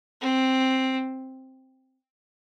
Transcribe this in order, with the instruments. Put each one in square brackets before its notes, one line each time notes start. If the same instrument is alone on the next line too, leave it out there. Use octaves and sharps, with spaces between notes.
[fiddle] C4